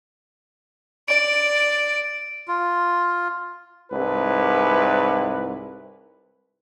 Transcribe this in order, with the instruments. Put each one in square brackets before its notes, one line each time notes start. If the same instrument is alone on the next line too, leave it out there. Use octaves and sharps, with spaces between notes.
[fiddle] D5 [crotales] D7
[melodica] F4
[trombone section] C2 G#2 E4 B4